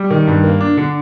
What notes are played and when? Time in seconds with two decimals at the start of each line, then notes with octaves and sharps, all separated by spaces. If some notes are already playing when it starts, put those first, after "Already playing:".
Already playing: G3
0.11 D#3
0.27 G2
0.44 A#3
0.61 D4
0.77 D3